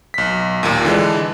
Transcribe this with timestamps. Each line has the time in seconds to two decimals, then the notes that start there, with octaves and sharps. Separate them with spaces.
0.14 B1 B6
0.63 D#2 A#2
0.85 D3 E3 G#3 D4